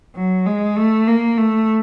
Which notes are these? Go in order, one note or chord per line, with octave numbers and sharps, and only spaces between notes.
F#3
G#3
A3
A#3
A3